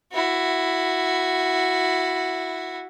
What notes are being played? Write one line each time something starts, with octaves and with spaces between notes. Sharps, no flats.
E4 F#4